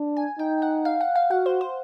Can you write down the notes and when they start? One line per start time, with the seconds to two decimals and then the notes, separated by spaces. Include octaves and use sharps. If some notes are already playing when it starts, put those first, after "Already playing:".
Already playing: D4
0.17 G#5
0.39 D#4 G5
0.62 F#5
0.85 F5
1.01 F#5
1.16 F5
1.31 F#4 F#5
1.46 C5
1.61 C5